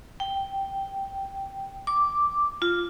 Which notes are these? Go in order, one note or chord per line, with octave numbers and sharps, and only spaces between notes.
G5
D6
F4